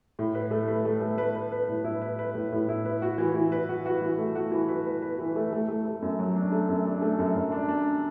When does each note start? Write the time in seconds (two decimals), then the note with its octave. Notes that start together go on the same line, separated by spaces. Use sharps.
0.19 A2
0.35 B4
0.51 A3
0.68 B4
0.85 A3
1.01 A3
1.18 B4
1.35 B4
1.52 B4
1.69 A2
1.84 E4
2.02 B4
2.19 B4
2.35 A2
2.52 A2
2.69 E4
2.85 B4
3.02 F#4
3.18 E3
3.35 E3
3.52 B4
3.69 F#4
3.86 F#4
4.01 E3
4.18 A3
4.35 F#4
4.52 E3
4.68 B4
4.86 B4
5.02 B4
5.19 E3
5.36 A3
5.53 A3
5.68 A3
5.85 A3
6.02 F#2
6.19 F#3
6.36 D4
6.52 A3
6.69 F#2
6.86 D4
7.02 A3
7.19 F#2
7.35 F#2
7.52 D4
7.69 D4